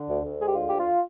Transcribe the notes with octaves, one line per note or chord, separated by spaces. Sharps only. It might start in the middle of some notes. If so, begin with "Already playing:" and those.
Already playing: D3
D2
D2
G#3 G#4
G4
D3 F4
D2 G4
F4